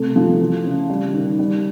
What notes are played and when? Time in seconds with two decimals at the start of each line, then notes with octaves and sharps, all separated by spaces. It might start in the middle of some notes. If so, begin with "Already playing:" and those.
Already playing: C3 A3
0.16 F3
0.39 E3
0.65 C#3
0.90 G3
1.13 D#3
1.39 G3